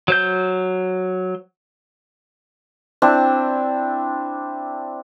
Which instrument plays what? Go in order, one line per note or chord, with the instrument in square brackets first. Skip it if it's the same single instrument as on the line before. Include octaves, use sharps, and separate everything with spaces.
[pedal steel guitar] F#3 C5 G6
[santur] C4 D4 E4